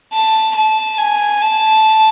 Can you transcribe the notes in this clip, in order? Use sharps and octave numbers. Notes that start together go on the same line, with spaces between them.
A5
A5
G#5
A5